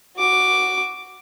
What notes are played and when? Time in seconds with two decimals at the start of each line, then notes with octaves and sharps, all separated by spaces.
0.17 F#4 D6